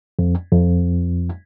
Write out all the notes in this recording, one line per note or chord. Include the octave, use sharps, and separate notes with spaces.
F2
F2